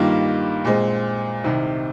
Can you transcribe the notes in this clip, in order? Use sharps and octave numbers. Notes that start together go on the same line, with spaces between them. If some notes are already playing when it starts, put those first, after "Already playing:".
Already playing: G2 D#3 G3 A#3 F4
A#2 G#3 C4
C2 C3 D#3